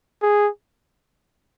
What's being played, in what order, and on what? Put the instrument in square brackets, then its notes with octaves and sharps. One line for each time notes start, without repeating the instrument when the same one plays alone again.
[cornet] G#4